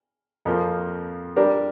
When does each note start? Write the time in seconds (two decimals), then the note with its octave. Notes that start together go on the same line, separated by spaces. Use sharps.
0.45 F2 F3 A#3
1.36 G3 D4 G4 A#4